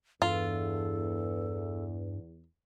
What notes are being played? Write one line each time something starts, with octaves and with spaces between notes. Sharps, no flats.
E2 G2 F4 A4